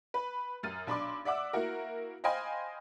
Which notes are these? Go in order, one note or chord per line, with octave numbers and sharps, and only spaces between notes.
B4
F#2 F6 A6 D#7
B1 D4 B5 C6 D6
D5 E5 F#5 D6 E6
A#3 E4 F#4 A#4
C5 D#5 F5 G5 G#5 B5